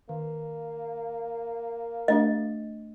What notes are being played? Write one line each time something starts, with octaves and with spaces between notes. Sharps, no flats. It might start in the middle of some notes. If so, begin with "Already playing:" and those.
D#3 A#3
A3 D4 G4 D#5